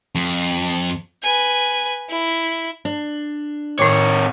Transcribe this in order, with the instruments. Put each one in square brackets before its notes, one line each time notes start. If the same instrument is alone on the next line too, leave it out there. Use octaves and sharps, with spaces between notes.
[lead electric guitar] F2
[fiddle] B4 G#5
E4
[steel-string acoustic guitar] D4
[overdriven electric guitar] F2 C#5 [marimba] A2 D6 [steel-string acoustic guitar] D#3 A#4